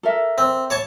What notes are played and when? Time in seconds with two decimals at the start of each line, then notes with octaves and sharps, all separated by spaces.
0.03 A4 A#4 E5
0.38 C4
0.70 C#5 A5 C#6